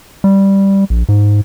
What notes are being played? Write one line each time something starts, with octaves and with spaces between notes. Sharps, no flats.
G3
A#1
G#2